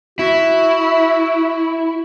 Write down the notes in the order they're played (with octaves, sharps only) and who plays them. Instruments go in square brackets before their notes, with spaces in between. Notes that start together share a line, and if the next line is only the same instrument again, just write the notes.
[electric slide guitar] E4 [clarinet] F#4